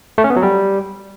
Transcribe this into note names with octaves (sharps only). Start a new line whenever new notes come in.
A3
C#4
B3
F#3
G3